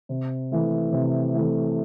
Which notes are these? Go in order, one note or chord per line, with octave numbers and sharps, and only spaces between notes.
C3
E3 A3 E4
C3
E3 A3 E4